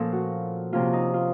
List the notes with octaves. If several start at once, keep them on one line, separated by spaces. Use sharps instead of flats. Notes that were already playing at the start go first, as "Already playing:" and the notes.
Already playing: A#2 F3 A#3 C#4 A4
F#4
C3 F3 A#3 C#4 F4
D#4
F4